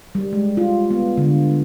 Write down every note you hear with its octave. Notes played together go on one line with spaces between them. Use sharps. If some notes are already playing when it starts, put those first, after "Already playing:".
G3
G#3
F4
B3
D3